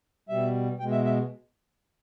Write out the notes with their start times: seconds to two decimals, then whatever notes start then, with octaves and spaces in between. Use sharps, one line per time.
0.29 B2 G3 E5
0.79 B2 G#3 G5
0.92 E5
1.05 E5